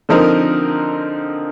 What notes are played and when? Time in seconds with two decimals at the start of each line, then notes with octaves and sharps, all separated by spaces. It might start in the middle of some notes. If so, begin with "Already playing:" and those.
0.09 D3 F3 C4 D#4 A#4